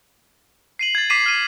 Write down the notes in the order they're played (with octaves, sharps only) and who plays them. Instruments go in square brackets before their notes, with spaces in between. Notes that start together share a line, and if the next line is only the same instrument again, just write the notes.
[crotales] C7 D#7 F#7
G#6 A6
D6 B6 C7 D#7
F6 D#7